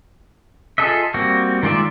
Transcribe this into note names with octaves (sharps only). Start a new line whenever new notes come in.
F4 G#4 A4 D#5 E5
G3 A#3 C4 F#4
D#3 G#3 F4 D5 E5